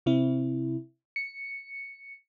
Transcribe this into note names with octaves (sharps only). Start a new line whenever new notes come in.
C3 C4 E4
C#7